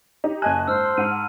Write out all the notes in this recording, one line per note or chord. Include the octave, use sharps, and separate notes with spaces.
D#4 G4
F#1 D#5 G#5 A5 F#6
G#2 C5 E6 F6
C6
G#2 F#5 F6 D#7